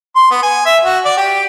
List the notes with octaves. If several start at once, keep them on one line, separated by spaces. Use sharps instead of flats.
C6
B3
G#5
E5
F#4
D5
G4